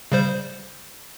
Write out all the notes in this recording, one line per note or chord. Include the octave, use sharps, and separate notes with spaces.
C#3 G3 C5